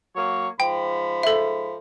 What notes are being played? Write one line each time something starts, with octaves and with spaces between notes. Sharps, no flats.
F#3 A#3 C#5
G#2 F3 G5 B5
A4 E5